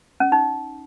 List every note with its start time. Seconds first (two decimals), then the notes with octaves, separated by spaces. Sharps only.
0.20 C#4
0.32 D#4